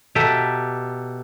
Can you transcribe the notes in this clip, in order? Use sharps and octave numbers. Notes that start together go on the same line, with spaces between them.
B2 G4 A4 E5 A#5